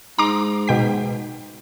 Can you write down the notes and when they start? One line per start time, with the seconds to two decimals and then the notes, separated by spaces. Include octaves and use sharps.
0.19 G#2 A#5 C6 D6
0.68 B2 G5 B6